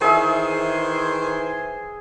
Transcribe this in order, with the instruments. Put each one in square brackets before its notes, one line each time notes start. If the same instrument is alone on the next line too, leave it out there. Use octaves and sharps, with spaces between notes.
[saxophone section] D#3 E3 C5 [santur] G#4 E5